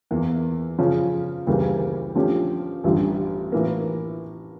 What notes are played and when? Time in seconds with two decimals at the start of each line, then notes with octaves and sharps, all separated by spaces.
0.11 E2 E3 A#3
0.78 C#3 F3 C#4
1.47 D2 C#3 E3 G3 A#3
2.15 D3 F3 A3 C#4 G4
2.84 A1 G2 D3
3.52 A2 E3 A#3